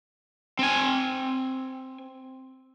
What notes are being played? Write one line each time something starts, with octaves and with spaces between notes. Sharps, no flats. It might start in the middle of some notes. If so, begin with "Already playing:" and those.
C4 G#5